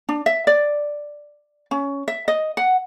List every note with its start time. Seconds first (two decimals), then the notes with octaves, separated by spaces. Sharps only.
0.09 D4
0.26 E5
0.47 D5
1.71 C#4
2.08 E5
2.28 D#5
2.57 F#5